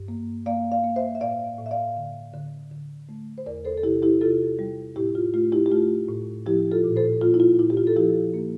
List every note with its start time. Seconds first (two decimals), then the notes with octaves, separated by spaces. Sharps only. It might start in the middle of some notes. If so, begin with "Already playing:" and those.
Already playing: G2
0.08 A#3
0.46 A#3 D5 F5
0.72 D5 F5
0.84 A#3
0.96 C5 E5
1.15 E5
1.21 A2 D5 F5
1.59 A2
1.66 E5
1.71 D5 F5
1.97 D3
2.34 D3
2.71 D3
3.09 A3
3.38 C5
3.46 E2 A#4 D5
3.65 A4 C5
3.78 A4
3.83 C3 E4 G4
4.02 E4 G4
4.21 C3 F4 A4
4.59 G3
4.96 A2 E4 G4
5.15 F4
5.34 A3 F4
5.52 E4 G4
5.66 G4
5.72 A3 F4
6.09 A2
6.46 F3 E4 G4
6.72 F4 A4
6.84 A#2
6.96 A4 C5
7.21 A#3 F4
7.34 E4
7.40 F4
7.59 A#2 E4
7.70 G4
7.77 F4
7.87 A4
7.96 F3 E4 G4
8.34 A#3